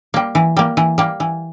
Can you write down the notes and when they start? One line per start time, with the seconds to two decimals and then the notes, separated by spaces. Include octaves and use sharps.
0.14 G3 A#3
0.35 E3
0.57 G3 A#3
0.77 E3
0.98 G3 A#3
1.20 E3